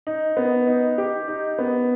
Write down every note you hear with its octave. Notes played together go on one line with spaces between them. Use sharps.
D#4
B3
D#4
G4
D#4
B3